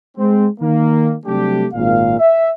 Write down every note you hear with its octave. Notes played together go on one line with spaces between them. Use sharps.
G#3 C4
D#3 A#3
C3 F#3 G3 A3 D4 G4
G#1 A#2 F5
E5